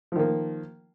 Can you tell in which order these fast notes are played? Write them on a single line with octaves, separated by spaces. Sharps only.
F3 D#3 A#3